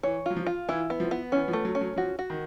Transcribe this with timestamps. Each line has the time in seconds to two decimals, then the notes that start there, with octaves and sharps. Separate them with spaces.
0.03 E3 C#5
0.26 F#3 F4
0.36 F3
0.47 F4
0.68 E3 E4
0.90 B3
1.00 F3
1.11 B3
1.32 E3 C#4
1.48 F3
1.53 A3
1.65 F#3
1.75 C#4
1.81 F#3
1.96 F3 F#4
2.19 F#4
2.30 D#3